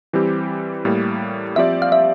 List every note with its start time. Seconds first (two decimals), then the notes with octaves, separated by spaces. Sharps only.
0.13 E3 G3 C4 G4
0.85 A2 G3 A#3
1.56 F3 C4 G4 D5 E5
1.82 F5
1.92 E5